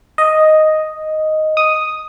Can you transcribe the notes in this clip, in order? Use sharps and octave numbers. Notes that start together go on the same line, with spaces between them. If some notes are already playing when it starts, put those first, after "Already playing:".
D#5
D#6